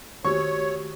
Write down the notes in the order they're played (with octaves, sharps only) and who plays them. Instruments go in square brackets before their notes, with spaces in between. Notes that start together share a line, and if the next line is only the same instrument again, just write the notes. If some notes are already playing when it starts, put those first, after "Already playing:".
[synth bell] D#3 F#4 G4 [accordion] C#5 [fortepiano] C#6